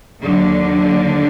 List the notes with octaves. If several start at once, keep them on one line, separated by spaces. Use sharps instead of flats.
D#2 D3 F#3